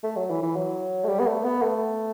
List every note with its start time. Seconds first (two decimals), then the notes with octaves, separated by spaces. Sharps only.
0.04 A3
0.16 F#3
0.30 E3
0.43 E3
0.56 F#3
1.04 A3
1.09 G3
1.20 B3
1.27 A3
1.45 B3
1.62 A3